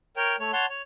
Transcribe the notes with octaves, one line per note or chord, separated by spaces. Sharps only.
A#4 C#5 G5
A3 C#5
C#5 F#5 A5 C6
C#5